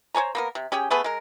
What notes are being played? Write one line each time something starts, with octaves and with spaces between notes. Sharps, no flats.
C5 C#5 G#5 A#5
A#3 B3 A#4
C3
C#4 G4 G#4 G5
A3 B3 G#4 B4
G#3 A#4